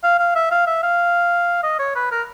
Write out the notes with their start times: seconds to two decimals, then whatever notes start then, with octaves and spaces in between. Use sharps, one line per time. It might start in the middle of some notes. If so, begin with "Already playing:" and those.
0.04 F5
0.19 F5
0.35 E5
0.51 F5
0.67 E5
0.83 F5
1.63 D#5
1.79 C#5
1.96 B4
2.12 A#4